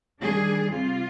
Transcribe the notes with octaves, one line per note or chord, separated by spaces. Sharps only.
D#3 G3 D4 G#4
C3 G3 C4 F4